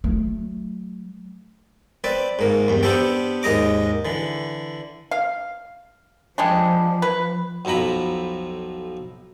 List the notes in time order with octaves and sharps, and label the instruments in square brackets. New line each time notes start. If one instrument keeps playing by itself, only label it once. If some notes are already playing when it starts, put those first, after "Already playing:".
[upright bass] F#3 A3
[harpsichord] C4 B4 D5
G#2 A#3
E2 G2
B3 C4 D4 G4 A4 G5
D#2 G#2 D#5 A#5 D6
D3 E3
[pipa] F5
[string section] F3 [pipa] G3 G#3 D4
[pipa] B4
[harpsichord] B1 F2 F3 A#5 B5